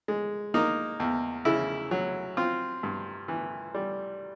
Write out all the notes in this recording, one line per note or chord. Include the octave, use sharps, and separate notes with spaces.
G#3
A#3 D#4
E2
C#3 E4
F#3
C4 F4
G2
E3
G3